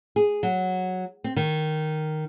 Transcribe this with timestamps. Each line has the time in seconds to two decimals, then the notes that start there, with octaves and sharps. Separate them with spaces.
0.16 G#4
0.43 F#3
1.24 C4
1.36 D#3